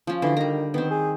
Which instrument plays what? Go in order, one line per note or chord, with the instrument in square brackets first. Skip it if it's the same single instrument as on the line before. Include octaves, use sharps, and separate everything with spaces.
[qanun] F3 C#4
[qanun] D3 F#4 [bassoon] E3
[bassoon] D#3 [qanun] G3 A#5
[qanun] D#3 C4 [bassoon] B3
[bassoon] G#4